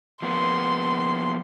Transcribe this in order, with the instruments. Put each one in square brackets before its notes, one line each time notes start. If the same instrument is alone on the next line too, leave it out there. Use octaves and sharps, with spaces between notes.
[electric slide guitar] F3 A#3 B3 [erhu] C6